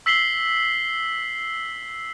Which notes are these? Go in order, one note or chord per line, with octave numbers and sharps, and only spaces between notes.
E6 B6 C7 F#7 G7